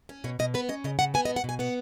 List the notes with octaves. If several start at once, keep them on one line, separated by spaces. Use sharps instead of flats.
C#4
B2 C#5
B2 D#5
B3 B4
C#4 D#5
C#3 D#5
C#3 F#5
B3 G#5
D#5
B2
F#5
B2 G#5
B3 F#5